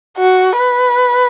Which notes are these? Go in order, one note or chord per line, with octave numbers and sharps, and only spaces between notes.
F#4
B4